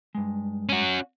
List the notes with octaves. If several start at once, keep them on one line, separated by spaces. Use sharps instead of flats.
G2 G#3
C#4 F#4